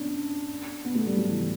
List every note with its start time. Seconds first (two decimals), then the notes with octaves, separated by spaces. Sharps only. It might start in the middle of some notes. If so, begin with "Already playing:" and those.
Already playing: B3 C#4 D4
0.85 B3
0.95 A3
1.06 G3
1.18 F#3
1.29 E3